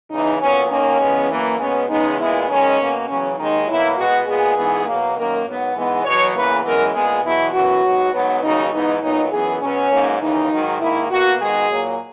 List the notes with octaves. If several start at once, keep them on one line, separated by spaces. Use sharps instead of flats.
E2 C#3 E3 D#4
A#2 F#3 B3 C#4
D#2 D#3 A#3 C#4
E2 C#3 G#3 B3
F#2 E3 A#3
B2 G#3 B3 C#4
E2 C#3 G#3 B3 D#4
A#2 G#3 B3 E4
F#2 D#3 G#3 C#4
B2 A#3
E2 C#3 F#3 C#4
D#2 D#3 G#3 D#4
B2 F#3 A#3 E4
B2 G#3 B3 F#4
A#2 G#3 B3 G#4
G#2 E3 B3
B2 F#3 A#3
F#2 D#3 A#3 A#4
G#2 F#3 B3
G#2 E3 G#3 B3
E2 B2 F#3 C#5
E2 C#3 E3 A#3 B4
F#2 E3 G#3 B3 A#4
A#2 G#3 B3 G#4
E2 B2 F#3 B3 E4
F#2 E3 B3 F#4
G#2 F#3 B3
G#2 F#3 B3
D#2 C#3 F#3 D#4
G#2 E3 B3 D#4
A#2 F#3 B3 D#4
F#2 E3 B3 G#4
B2 F#3 B3 C#4
G#2 F#3 A#3
D#2 C#3 E3 D#4
G#2 D#3 F#3
G#2 D#3 A#3 E4
B2 A#3 F#4
G#2 D#3 G#3 B3 G#4
A#2 F#3 A#3